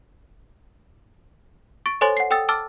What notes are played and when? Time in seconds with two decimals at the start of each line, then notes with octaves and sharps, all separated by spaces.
1.86 C#6 A6 D7
2.01 A4 C5 C#5 G#5 C6 A6
2.17 F#5 C7
2.30 A4 G5 D#6 E6 A6
2.49 A5 D6 E6 F6 A6